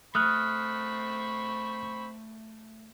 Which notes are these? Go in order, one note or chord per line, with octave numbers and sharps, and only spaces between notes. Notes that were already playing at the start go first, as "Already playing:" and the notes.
A3 C4 B5 C#6 D#6 F6 F#6